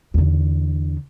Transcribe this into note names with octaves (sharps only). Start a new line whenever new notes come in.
E2 D3